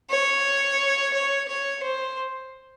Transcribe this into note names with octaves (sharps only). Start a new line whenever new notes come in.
C#5
C#5
C#5
C5